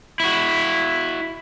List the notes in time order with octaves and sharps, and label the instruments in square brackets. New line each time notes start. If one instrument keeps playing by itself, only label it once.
[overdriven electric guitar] E4 F#4